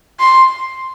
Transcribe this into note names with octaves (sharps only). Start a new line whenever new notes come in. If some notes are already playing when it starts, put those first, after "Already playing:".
C6